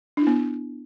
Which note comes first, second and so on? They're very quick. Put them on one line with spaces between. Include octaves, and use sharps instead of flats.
D4 E4 B3